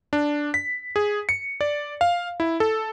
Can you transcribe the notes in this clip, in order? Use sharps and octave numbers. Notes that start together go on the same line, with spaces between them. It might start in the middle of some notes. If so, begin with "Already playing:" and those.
D4
B6
G#4
C#7
D5
F5
E4
A4